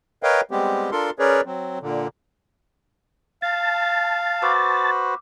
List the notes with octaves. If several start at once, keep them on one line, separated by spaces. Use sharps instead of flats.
A#4 B4 C#5 D#5 F5 G5
G3 G#3 B3 C4 G4
D4 F4 A4 A#4 C6
C#4 G#4 A#4 B4 C#5 D5
F#3 C4
A#2 D3
F5 A5
F#4 B4 C5 D6 E6